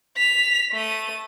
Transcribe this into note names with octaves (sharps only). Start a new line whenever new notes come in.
B6 F7
A3 D#7